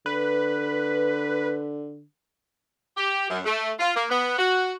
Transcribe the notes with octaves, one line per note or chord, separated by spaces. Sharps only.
D3 B4
G4
F#2
A3
F4
A#3
B3
F#4